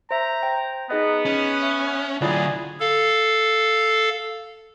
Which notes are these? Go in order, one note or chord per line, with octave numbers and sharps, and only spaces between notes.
C5 E5 A#5
C5 G5
B3 D#4 G#4 D#5
C#4
E5
D3 F#3 E4 F4 G#4 D5
A4 F5